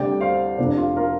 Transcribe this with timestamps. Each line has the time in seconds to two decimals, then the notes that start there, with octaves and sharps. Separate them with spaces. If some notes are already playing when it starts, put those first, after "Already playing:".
Already playing: D2 C3 G3 D5 G5
0.21 C5 F5
0.58 F1 F2 C3 F3 D4
0.77 F4
0.96 F4 A#4